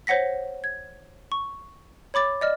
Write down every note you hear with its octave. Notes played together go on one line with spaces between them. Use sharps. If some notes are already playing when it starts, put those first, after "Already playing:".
C5 C#5 F#5 A#6 B6
G#6
C#6
C#5 B5 D6 A6
D5 D#5 F6